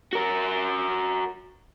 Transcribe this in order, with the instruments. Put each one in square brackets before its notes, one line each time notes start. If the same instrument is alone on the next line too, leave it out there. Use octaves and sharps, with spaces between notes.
[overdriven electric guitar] F#4 A#4